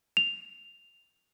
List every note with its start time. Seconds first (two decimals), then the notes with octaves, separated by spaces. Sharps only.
0.17 F7